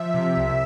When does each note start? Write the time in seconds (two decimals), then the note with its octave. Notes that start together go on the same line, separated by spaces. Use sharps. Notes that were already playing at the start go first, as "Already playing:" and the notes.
Already playing: F3 E5
0.14 C3
0.37 C2